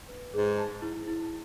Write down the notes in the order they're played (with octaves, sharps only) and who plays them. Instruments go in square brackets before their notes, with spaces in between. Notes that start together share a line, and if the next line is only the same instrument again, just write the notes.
[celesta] B4
[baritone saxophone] G#2 [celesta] G#4
[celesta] A5
E4
E4